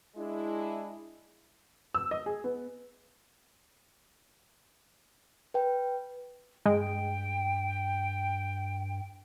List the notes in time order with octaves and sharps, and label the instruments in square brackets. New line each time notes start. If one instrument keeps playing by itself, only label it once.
[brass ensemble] G#3 D4 E4
[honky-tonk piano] E6
D#5
G#4
B3
[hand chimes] B4 G5
[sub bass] G2 [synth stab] G#3 [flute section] G5